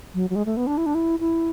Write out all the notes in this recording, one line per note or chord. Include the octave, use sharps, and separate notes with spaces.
F#3
F#3
G#3
A3
B3
D4
E4
D4
E4
E4